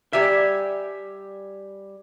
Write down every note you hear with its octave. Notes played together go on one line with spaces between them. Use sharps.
G3 G4 E5 G#5